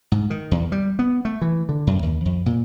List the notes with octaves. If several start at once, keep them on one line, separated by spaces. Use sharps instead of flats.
G#2
D#3
E2
G3
B3
A3
E3
D3
F#2
D#2
F2
A#2